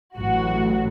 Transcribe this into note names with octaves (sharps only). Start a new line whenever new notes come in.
A1 A2 F#3 F#4